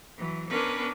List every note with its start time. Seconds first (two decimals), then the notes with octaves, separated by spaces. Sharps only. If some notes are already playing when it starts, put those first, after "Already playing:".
0.18 E3 F#3
0.49 B3 C#4 D4 A#4 B4 G#5